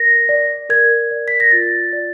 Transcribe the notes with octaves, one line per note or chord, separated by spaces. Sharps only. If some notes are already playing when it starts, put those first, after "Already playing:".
Already playing: A#4 A#6
D5
A#4 G#6
D5
B6
A#6
F4 A6
D5